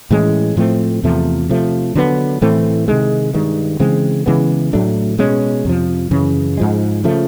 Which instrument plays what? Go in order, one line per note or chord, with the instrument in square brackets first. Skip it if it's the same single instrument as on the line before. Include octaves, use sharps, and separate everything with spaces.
[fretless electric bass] A2 E3 G#3 C#4
A2 F3 A3 C4
E2 C3 F3 A3
C3 F3 A3
D3 F#3 B3
A2 E3 A3 C4
C3 D#3 G#3
G2 D#3 G#3
C#3 E3 G#3 C4
C#3 E3 G#3 B3
A2 F#3 A3 D4
B2 G#3 C#4
F2 C3 F3
F#2 C#3 E3
G#2 F3 G#3
C#3 F3 A3